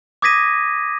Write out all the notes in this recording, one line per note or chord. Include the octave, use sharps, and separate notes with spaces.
D6 D#6 G#6 A#6 B6 D#7